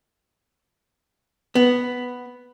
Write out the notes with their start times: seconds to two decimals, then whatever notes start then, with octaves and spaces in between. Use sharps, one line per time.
1.55 B3